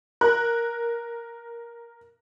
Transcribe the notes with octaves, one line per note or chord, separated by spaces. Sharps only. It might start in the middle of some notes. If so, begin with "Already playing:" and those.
A#4 F#6